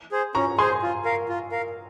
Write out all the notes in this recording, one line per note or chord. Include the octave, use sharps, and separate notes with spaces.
G#4 C5
C#4 A#5 C#6
G#4 C5 G#5 C6
F4
A#4 F5
F4
A#4 F5